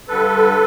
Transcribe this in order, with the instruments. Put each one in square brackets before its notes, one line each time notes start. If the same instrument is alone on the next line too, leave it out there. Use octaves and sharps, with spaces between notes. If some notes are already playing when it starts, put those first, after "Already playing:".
[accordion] G2 D3 G3 A4 B4